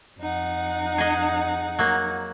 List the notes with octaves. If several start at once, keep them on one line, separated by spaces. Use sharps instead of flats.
F2 D#4 F#5
G#4 D#5
F#3 A#3